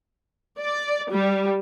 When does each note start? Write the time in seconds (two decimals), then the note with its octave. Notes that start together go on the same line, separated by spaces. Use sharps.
0.60 D5
1.11 G3